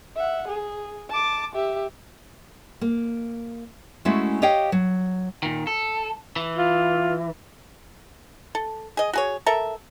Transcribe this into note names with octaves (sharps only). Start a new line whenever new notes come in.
E5 F#5
G#4
A5 D6
G4 E5
A#3
G#3 A3 C#4 E4 F#4
G4 C#5 D#5 F5 G5
F#3
A#2 D#3
A4
E3
F4
A4
G#4 D#5
F#4 G#4 C#5
A4 A#4 E5